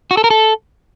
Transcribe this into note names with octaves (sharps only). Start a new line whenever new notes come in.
F#4
A4
A#4
A4